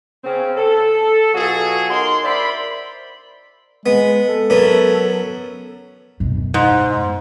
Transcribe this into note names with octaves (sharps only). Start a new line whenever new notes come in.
C#3 C4 C#4
A4
B2 F#3 F4 F#4 G#4 A4
D#4 A#4 F#5 C6
A#4 C5 D5 E5 B5
G#3 B3
A4
F#2 F#3 B3
F#2 B2
G#2